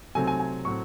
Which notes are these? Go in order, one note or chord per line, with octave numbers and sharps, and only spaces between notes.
C3 F#3 A3 C4 G#5
G#5
G#5
A2 F#3 C4 C#6